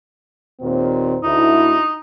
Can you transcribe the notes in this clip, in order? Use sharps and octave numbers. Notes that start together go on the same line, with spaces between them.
D#2 A#2 C4
D2 D#4 E4